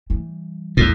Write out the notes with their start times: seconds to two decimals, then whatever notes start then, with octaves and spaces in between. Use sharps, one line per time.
0.10 E3 G3
0.77 A#1 E2 A2 E3